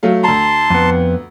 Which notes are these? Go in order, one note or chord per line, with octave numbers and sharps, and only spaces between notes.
F#3 A3 F5
D2 A5 A#5 C6
F2 B3